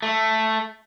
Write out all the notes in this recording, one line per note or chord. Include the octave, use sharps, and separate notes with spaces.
A3